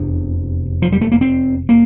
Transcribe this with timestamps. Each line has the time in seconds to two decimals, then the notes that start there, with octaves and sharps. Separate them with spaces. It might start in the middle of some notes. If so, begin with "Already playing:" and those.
Already playing: F1 E2 C3 D4
0.82 F3
0.92 G3
1.01 A3
1.12 A#3
1.21 C4
1.69 A#3